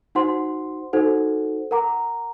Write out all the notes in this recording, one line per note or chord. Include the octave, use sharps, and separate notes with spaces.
D#4 F#4 C5 F#5 C6
D#4 F#4 A4 C5 F#5
A#4 F#5 A#5 D6